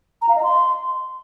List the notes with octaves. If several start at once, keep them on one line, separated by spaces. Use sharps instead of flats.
A#5
F5
D#5
C6